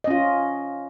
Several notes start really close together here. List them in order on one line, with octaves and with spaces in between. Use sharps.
D#5 C#4 F4